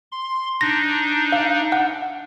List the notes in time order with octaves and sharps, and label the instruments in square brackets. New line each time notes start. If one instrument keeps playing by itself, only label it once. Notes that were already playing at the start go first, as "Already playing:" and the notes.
[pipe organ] C6
[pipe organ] D4 D#4 [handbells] A#6
[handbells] F5
F#5